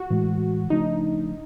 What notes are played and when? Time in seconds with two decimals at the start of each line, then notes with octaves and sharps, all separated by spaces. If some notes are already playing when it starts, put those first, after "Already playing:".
Already playing: F#4
0.10 A2 E3 G#3
0.70 C#3 F3 A3 D4 D#4